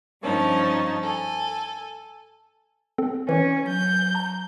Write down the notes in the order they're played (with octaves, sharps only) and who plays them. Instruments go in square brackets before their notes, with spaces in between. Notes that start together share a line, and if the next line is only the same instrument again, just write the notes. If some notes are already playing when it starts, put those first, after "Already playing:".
[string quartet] G2 F3 C#4 D#4 A5
A4 G#5
[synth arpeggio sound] C4 A4
[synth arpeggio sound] E3 D5 [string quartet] C#4
[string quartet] F#3 G6
[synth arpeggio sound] A5 A#5